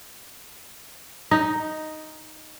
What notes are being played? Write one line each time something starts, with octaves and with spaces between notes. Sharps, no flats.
D#4